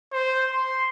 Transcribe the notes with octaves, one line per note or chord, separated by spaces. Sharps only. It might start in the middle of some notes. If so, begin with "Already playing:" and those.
C5
C6